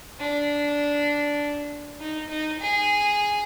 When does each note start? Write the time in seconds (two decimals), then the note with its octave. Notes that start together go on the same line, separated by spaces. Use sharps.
0.19 D4
2.00 D#4
2.30 D#4
2.60 G#4